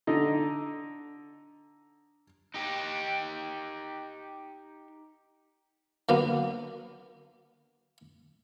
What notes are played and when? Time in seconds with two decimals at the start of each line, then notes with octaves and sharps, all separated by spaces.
0.07 D3 D#4
2.54 D#4 G4
6.09 D3 F#3 A#3 B3